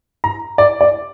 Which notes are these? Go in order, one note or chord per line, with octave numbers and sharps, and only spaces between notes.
A#5
D5
D5